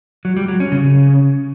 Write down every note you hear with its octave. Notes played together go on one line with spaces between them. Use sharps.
F#3
G3
F#3
C#4
C#3